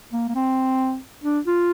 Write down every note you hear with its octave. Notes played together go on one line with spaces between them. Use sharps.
A#3
A#3
C4
D4
F4